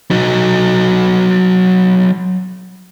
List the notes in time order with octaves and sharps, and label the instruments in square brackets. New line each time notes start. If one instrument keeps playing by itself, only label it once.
[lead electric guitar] F#3 D#4